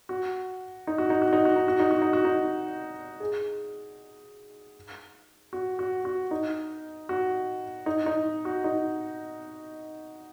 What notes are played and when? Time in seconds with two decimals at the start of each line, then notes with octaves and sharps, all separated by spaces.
0.09 F#4
0.87 D#4
0.98 F#4
1.10 D#4
1.22 F#4
1.33 D#4
1.45 F#4
1.56 D#4
1.68 F#4
1.80 D#4
1.91 F#4
2.02 D#4
2.13 F#4
2.25 D#4
3.20 G#4
5.53 F#4
5.79 F#4
6.05 F#4
6.31 D#4
7.09 F#4
7.86 D#4
8.06 D#4
8.45 F#4
8.64 D#4